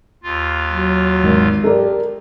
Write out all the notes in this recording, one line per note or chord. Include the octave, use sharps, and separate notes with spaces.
D#2 F4
F#3
G#1
G4 A4 A#4 D5